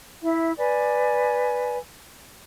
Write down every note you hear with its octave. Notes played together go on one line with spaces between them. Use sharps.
E4 E5
B4 D5 G#5